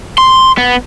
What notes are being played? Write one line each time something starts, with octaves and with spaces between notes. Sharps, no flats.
C6
B3